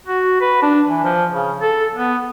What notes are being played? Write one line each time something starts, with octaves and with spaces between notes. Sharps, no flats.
F#4
B4
D4
E3
F3
C#3
A4
B3